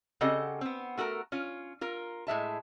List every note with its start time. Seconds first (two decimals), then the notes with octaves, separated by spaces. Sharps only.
0.21 C#3 C4 G4 A4 D#5 F#5
0.61 B3 C4
0.98 A3 F#4 A4 A#4
1.32 C#4 F4
1.81 F4 A#4
2.27 A2 G#3 E5 A5